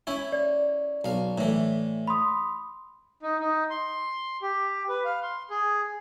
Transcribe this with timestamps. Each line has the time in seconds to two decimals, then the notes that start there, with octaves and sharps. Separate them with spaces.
0.07 C#4 E4
0.32 D5
1.04 B1 F5
1.38 A2 E3
2.07 B5 C6 D#6
3.22 D#4
3.40 D#4
3.70 C6
4.42 G4
4.89 B4
5.05 F5
5.23 C6
5.50 G#4